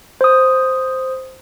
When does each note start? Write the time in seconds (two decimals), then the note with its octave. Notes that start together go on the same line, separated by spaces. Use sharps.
0.21 C5 D#6